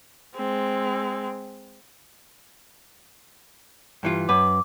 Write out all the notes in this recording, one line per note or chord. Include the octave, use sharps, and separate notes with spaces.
G#3 C4
G2 E3 F4
F#2 B4 D6